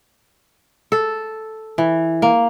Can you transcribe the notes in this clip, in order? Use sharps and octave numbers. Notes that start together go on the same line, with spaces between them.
A4
E3
A#3